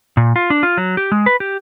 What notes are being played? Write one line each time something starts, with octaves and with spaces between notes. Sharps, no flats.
A#2
F4
D4
F4
F#3
G4
G#3
B4
G4